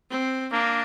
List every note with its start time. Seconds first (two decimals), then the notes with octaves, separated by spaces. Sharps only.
0.10 C4
0.52 A#3 D4